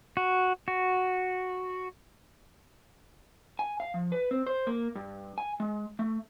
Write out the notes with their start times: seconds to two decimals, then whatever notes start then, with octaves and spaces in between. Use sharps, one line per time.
0.17 F#4
0.68 F#4
3.59 G#5
3.80 F5
3.94 F3
4.12 B4
4.31 C4
4.47 C5
4.67 A#3
4.95 G2
5.38 G#5
5.60 G#3
5.99 A3